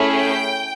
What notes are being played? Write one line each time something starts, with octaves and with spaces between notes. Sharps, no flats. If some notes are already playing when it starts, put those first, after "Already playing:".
Already playing: A3 C#4 E4 G#4
G5